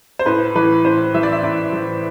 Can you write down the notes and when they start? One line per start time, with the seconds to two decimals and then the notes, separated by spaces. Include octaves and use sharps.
0.19 C5
0.26 A2 B4
0.55 E3 B4
0.85 A2 C5
1.14 E3 E5
1.23 D5
1.32 E5
1.43 A2 D5
1.73 E3